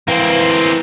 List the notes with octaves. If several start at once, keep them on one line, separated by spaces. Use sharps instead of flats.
E3 A#3 C4